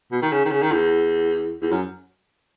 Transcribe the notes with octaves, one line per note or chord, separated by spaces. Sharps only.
B2
D#3
C#3
D#3
C#3
D#3
E2
E2
F#2